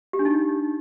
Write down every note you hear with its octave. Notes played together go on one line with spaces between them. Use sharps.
G4
D4
D#4